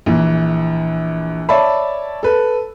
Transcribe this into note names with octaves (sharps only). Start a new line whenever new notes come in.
A#1 E3
C#5 D5 E5 A5 B5
A4 B4